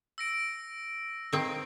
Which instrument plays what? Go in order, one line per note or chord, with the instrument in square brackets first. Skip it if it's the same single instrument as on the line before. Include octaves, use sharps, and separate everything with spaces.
[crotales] E6 A#6 D7
[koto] D#3 C4